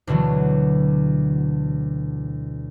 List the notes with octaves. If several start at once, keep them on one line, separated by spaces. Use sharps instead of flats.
D2 B2 D3 E3 F#3